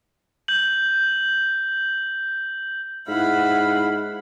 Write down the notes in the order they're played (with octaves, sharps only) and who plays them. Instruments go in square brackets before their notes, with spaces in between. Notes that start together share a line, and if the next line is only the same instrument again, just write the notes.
[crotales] G6 F#7
[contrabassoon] G#2 [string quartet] E4 F#5 B5 [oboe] F5